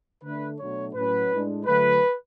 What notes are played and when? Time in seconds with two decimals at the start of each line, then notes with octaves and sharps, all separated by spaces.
0.23 D3 A3 D4 B4
0.59 B2 F#3 A3 D4 C#5
0.94 A2 F#3 C#4 B4
1.30 A2 G#3 D4
1.65 D3 F#3 A3 B4